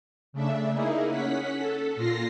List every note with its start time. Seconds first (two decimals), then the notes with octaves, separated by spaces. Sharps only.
0.33 C#3 A3 D4 E5
0.72 A#3 D#4 E4 G#4
1.08 C#4 F#5 B6
1.59 A4
1.96 A#2 F4 A#6 C7